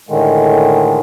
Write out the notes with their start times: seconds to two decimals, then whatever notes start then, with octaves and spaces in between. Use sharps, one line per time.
0.09 A2 D3 D#3 G#3